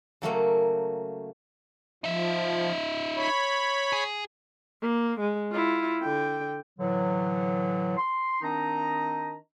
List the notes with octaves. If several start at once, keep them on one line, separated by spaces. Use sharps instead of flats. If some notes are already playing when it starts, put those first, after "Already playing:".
C#3 F#3 A3 A#3
F3 D#4 E5
C#5 B5
G#4
A#3
G#3
E4 F4
D3 G5
A2 D3 E3 F#3
C6
D#3 C4 D4 D#4 D#5 A#5